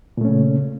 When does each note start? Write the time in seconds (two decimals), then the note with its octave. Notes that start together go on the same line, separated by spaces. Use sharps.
0.17 A#2
0.21 A3
0.25 C#4
0.29 C#3